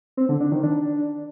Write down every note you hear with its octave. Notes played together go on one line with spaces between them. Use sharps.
C4
D3
D4
D#3
D4